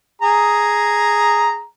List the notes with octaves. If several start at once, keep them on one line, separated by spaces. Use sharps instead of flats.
G#4 A#5